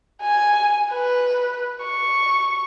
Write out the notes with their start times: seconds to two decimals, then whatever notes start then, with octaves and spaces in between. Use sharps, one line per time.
0.22 G#5
0.93 B4
1.84 C#6